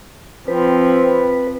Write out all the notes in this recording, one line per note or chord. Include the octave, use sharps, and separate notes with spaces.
F3 C4 B4